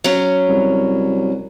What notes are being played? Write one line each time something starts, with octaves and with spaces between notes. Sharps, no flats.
F#3 C#4
C2